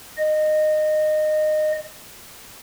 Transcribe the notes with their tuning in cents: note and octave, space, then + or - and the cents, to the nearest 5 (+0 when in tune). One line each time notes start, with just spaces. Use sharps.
D#5 -20